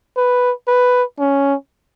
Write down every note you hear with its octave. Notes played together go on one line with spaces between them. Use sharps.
B4
B4
C#4